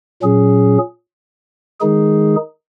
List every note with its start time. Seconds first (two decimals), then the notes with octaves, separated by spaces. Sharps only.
0.22 A#2 F#3 C#4 G#4
1.81 D#3 G#3 D#4 G#4